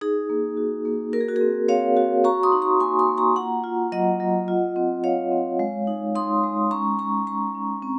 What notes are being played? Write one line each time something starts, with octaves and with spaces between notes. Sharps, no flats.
D#4 G#4
A#3
F#4
A#3
F#4 A#4
G#4
F#4
C4 G#4
C4 C#5 F5
F#4
F#4 A#5 C#6
C6 D#6
D#4
A#5 C#6
A#3 G#5 C6
C6 D#6
A#3
A#5 C#6
F4 F#5 A#5
F4
F#3 D#5 F#5
F#3
F4
C4
C4 C#5 F5
C4
G#3
D#4
D#4 C6 D#6
G#3
C#4 A#5 C#6
C#4 A#5 C#6
G#3 A#5 C#6
C#4
C4